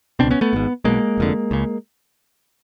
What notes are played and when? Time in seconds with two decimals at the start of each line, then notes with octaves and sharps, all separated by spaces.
0.19 C#2 B2 C4 D4
0.31 B3 C#4
0.41 A3 B3
0.53 G#1 G#2
0.85 B1 B2 G#3 A#3
1.18 F1 F2 D3
1.51 C#2 C#3